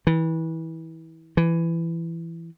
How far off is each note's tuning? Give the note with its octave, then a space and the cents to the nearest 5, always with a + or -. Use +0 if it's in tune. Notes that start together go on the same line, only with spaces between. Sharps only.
E3 -25
E3 +15